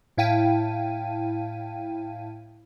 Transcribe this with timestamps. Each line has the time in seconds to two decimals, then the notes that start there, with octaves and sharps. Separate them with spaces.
0.17 A2 E4 F5 G5 A5 D#7